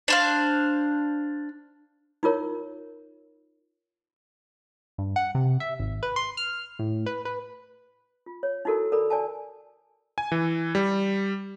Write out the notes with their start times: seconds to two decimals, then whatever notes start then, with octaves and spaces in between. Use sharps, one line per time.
0.08 D4 C5 F5
2.23 D#4 F4 A#4 C#5
4.98 G2
5.16 F#5
5.35 C3
5.60 E5
5.79 G#1
6.03 B4
6.16 C6
6.37 F6
6.79 A2
7.06 B4
7.25 B4
8.26 F4
8.43 C#5
8.65 D#4 E4 F#4 A4 A#4
8.92 A4 A#4 D5 B5
9.10 D5 G#5 A5
10.18 G#5
10.32 E3
10.75 G3